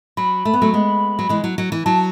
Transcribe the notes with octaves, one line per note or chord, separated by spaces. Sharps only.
F#3 B5
A3
B3
F#3 A3
G#3 B3
F#3
E3 G#3
F#3
F#3
E3
F#3 A5